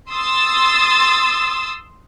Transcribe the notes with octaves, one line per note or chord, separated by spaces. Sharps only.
C6 D#6 E6 A6